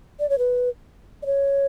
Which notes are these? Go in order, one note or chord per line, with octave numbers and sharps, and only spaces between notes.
D5
C#5
B4
D5
C#5